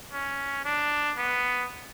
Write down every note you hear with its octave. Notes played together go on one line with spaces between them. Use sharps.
C#4
D4
B3